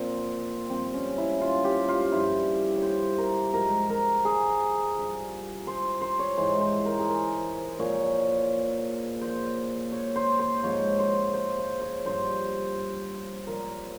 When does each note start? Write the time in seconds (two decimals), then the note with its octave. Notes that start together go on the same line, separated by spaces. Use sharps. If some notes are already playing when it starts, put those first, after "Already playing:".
Already playing: A#2 F3 C4
0.70 G2 F3 C4
0.94 C#4
1.18 E4
1.41 F4
1.64 G4
1.88 F4
2.12 G2 F3 E4
2.76 C#5
2.82 C5
3.18 A#4
3.53 G#2 F3 A#4
3.90 A#4
4.25 G#4
4.96 G2 F3
5.67 C5
6.02 C5
6.19 C#5
6.37 G#2 E3 C5
6.61 C5
6.86 A#4
6.99 G#4
7.09 A#4
7.79 A#2 F3 C#5
9.21 A#2 F3 C5
9.92 C#5
10.16 C5
10.39 C5
10.63 G#2 F3 C#5
10.99 C5
11.34 C5
11.58 C5
11.82 C#5
12.05 G2 F3 C5
13.47 A#2 F3 A#4